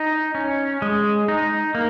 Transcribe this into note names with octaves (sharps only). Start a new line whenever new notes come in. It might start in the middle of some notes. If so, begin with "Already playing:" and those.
Already playing: D#4
C#4
G#3
D#4
A#3